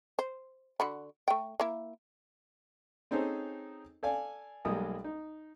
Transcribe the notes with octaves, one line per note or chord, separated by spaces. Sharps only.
C5
D3 F#4 B5
A3 G5
A#3 E4
C4 C#4 D#4 G#4 A4 C5
A4 D5 F5 G#5
B1 G3 G#3 A#3 D#6
D#4